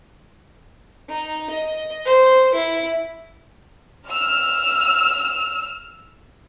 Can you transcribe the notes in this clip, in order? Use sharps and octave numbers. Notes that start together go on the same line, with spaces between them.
D#4
D#5
C5
E4
E6 F6